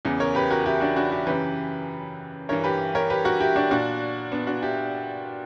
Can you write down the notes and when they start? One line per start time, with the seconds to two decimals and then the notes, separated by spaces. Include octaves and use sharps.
0.05 E2 C#3 E3
0.20 A#4 C#5
0.35 G4 B4
0.51 F#4 A#4
0.66 E4 G4
0.81 D4 F#4
0.96 D4 F#4
1.12 E4 G4
1.26 F#2 C#3 E3 G4 B4
2.49 G2 E3 A#4 C#5
2.64 G4 B4
2.95 A#4 C#5
3.10 G4 B4
3.25 F#4 A#4
3.40 E4 G4
3.56 D4 F#4
3.71 A#2 D4 F#4
4.32 B3 D4
4.47 D4 F#4
4.63 E4 G4